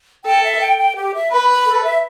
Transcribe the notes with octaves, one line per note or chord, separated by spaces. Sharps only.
A4 G5
E5
G5
G5
G4
E5
B4 B5
B5
A4
E5